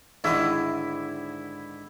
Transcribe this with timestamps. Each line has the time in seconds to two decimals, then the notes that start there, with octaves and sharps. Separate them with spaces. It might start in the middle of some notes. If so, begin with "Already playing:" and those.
0.24 G#2 D3 D#3 E4